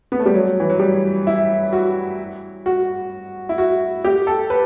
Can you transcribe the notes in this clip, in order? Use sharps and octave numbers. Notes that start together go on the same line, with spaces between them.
B3
A3
G3
F#3
E3
F#3
G3
E4
F#4
F#4
E4
F#4
G4
A4
B4